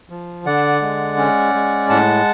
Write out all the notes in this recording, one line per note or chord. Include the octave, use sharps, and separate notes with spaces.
F3
D3 D5 F#5
G#3
C#4
G#3
A2 F#5 A5